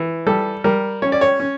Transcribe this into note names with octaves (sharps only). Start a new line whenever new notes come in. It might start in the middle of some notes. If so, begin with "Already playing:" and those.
Already playing: E3
G3 A4
G3 A#4
C#4 C#5
D5
C#5
C#4